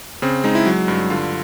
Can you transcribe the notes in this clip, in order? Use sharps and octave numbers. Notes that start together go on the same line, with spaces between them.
C#3 C4
G#3 D#4
E4
F#3
G2
D3 F4